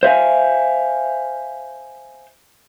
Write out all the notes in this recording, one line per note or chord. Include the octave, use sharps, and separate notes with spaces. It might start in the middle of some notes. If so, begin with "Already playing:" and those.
C5 E5 F5 G#5